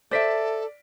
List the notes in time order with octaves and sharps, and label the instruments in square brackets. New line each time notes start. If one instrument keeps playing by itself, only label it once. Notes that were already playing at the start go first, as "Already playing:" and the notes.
[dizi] A4 [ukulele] C5 E5 [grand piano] D5 B6 D7